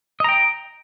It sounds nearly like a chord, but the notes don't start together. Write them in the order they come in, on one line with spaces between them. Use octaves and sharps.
D#5 A#5 G5